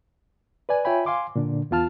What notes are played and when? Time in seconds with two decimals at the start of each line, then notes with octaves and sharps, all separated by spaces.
0.69 B4 D5 G#5
0.85 F4 C#5 E5 G5 G#5 B5
1.06 F5 G#5 C6 D6
1.35 A#2 D3 D4
1.71 E2 B3 F4 A5 F6